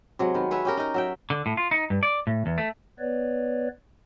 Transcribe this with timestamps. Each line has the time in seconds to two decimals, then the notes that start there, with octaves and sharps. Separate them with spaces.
0.19 C3 F#3 G#3
0.34 D#3 B3
0.51 G#4 B4 C#5 E5
0.65 C#4 G4 A#4
0.77 D#4 A#4
0.94 F#3 E5 G5
1.30 D3
1.46 A2
1.57 F4
1.71 D#4
1.90 G2
2.03 D5
2.27 A2
2.46 E2
2.58 A3
2.99 B3 B4 C#5 D5